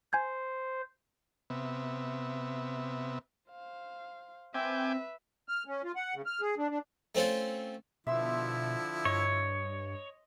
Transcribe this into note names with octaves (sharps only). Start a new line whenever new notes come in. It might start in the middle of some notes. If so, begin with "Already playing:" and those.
C5 G#5 G6 G#6
C3 B3 E5
C5 F5
C4 B4 E5 G5 G#5 D6
F6
C#4
F4
F#5
C#3
F6
G#4
D4
D4
A3 C4 C#4 F4
B2 D3 F3 E4 E5 C6 E6
G2 C#5 D#5